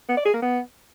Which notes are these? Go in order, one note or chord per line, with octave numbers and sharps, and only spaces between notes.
B3
D5
G#4
A#3
B3